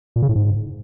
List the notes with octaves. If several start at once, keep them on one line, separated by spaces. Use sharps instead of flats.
A#2
C#3
A2
G#2